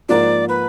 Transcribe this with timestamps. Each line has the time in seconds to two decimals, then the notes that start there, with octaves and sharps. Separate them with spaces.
0.09 G#2 F3 A#3 F4 D5
0.49 B4